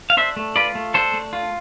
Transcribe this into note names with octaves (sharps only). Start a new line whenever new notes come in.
F5
D4 C5 E5
A3
F4 B4 D5
A3
D4 A4 C5
A3
F4